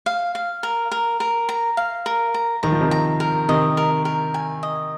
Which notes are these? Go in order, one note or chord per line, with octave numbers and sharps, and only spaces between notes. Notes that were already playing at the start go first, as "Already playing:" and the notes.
F5
F5
A#4
A#4
A#4
A#5
F5
A#4
A#5
D#3 A#5
F3
C3 D#3
A#5
A#4
C3 D#3 D#5
A#4
A#4
G#5
D#5